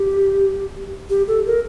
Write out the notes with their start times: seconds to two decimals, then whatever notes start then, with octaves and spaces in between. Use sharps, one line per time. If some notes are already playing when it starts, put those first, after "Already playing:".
Already playing: G4
1.10 G4
1.28 A4
1.46 A#4